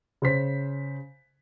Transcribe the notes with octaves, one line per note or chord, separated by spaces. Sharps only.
C#3 C5 B6